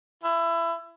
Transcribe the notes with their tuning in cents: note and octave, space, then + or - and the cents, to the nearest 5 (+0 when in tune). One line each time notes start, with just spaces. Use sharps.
E4 +25